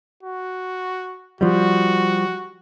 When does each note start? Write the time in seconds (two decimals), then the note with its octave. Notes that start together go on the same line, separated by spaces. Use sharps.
0.23 F#4
1.41 F3 G3 F#4